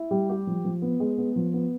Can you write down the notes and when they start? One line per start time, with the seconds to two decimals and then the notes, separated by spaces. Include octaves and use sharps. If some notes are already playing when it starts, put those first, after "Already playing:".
Already playing: E4
0.11 G3
0.29 G4
0.47 F3
0.65 F3
0.82 B3
1.00 G#3
1.18 B3
1.36 F3
1.54 B3